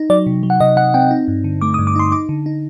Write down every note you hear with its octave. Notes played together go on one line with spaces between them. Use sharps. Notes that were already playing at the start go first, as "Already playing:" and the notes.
Already playing: D#4
F#3 D5
C3
F#3
F#5
C3 D#5
C3 F#5
C4 G5
D#4
G2
D3
A3 D6
D#6
G2
D6
D#4 C6
D#4 D6
D3
D#4